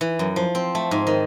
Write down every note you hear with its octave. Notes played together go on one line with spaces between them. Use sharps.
E3
F#2
F3
C4
A3
G#2
D#3